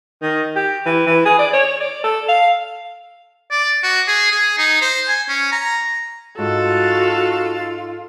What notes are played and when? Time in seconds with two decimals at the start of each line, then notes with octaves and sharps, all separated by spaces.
0.22 D#3
0.55 G4
0.85 E3
1.07 E3
1.25 G#4
1.39 D5
1.53 C#5
1.80 D5
2.04 A4
2.28 F5
3.51 D5
3.83 F#4
4.08 G#4
4.32 G#4
4.58 D#4
4.81 C5
5.08 G#5
5.29 C#4
5.52 A#5
6.38 G#2 F4 F#4 A4